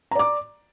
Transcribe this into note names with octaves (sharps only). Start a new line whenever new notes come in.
D5 A#5 D6